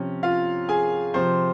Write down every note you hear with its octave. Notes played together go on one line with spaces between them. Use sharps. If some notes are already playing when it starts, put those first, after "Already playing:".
Already playing: C3 F3 C#4
F4 F5
G#4 G#5
C3 F3 C5 C6